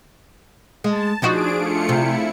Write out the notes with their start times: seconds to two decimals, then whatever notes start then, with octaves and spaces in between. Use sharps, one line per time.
0.84 G#3 A5
1.22 F3 D4 D#4 F#4 G#4 D7
1.56 A3 F4 C#7
1.89 C3 E4